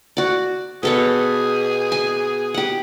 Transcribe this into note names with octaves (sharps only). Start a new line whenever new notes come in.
F#4 D5
B2 G#4 A4 C#5
G#5
G4 F#5